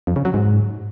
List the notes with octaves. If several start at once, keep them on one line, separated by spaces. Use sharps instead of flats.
F2
C#3
F#3
G#2